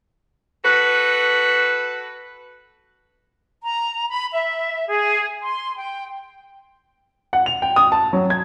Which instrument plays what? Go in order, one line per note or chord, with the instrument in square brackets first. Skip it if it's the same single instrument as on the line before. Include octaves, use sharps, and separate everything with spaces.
[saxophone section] F#4 A4 B4
[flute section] A#5
B5
E5
G#4
C6
G5
[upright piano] F#5
F7
G5
D#6
A5
F#3
G#6